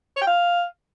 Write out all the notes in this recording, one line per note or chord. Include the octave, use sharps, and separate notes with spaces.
C#5
G5
F5